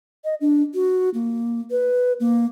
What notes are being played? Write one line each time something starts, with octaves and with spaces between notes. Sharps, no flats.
D#5
D4
F#4
A#3
B4
A#3